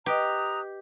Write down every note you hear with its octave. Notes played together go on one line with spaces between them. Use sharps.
G4 B4 D#5 A#5 D#6 F#6